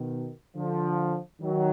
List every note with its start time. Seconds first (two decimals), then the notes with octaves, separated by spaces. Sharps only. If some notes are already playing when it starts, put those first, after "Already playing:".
Already playing: B2 D#3
0.56 D3 F3
1.42 D#3 F#3